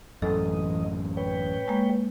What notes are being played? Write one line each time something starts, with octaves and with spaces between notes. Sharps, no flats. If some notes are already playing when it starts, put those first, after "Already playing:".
A1 F#2 E3 A4 D#5
B4 C#5 G5
G#3 A#3